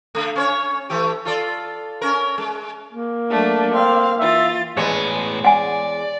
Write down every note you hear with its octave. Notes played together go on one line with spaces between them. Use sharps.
D3 A3
C#4 C5 C#5
E3 A3 G4
F4 A4 D5
C#4 A#4
G#3
A#3
F#3 A3 D4
C4 F5
E3 F4 E5 A6
E2 A2 G#3 B4 C#5
D5 F#5 G#5